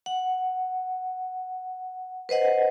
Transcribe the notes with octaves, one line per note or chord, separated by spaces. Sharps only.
F#5
B4 C5 D#5 F#5